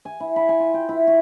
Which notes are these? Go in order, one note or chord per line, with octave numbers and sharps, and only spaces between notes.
G#5
E4
B5
G#5
F4
G5
E4
F#4